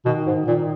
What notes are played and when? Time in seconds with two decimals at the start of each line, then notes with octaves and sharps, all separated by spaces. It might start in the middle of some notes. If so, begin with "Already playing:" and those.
0.05 B2 D#3
0.27 G#2
0.47 A#2 D#3